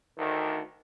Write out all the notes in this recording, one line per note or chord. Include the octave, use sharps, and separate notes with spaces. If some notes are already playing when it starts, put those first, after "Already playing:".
D2 D#3